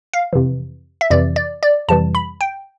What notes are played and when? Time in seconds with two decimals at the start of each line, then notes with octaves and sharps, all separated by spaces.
0.14 F5
0.33 F2 C3 E3
1.01 E5
1.11 F2 C3 E3 D5
1.36 D5
1.63 D5
1.89 F2 C3 E3 G3 A5
2.15 B5
2.41 G5